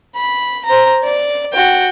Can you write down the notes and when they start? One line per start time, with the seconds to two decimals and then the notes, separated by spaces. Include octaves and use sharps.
0.16 B5
0.65 C5 A#5
1.04 D5
1.53 F#4 G5